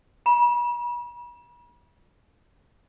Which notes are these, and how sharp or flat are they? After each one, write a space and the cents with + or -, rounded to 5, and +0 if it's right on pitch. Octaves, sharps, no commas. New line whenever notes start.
B5 -45